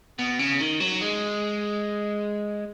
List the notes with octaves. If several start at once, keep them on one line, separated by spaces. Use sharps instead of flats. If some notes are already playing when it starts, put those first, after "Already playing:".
B2
C#3
D#3
F#3
G#3